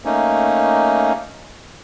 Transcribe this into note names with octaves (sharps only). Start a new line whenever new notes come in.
A3 A#3 C#4 D#4